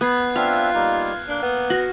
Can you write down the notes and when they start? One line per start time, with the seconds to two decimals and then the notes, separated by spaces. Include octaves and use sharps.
0.01 B3 F#6 G#6 C7
0.36 C4 D4 F4 E5 F5 F6
0.74 G3 A#3 D#4
1.28 A#3 D4 F#6
1.42 B3
1.70 F#4 A#6